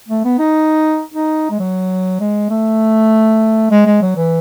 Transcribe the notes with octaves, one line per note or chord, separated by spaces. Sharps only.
A3
B3
D#4
D#4
G#3
F#3
G#3
A3
G#3
G#3
F#3
E3